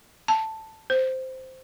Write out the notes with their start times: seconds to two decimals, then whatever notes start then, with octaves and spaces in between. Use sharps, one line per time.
0.28 A5
0.90 C5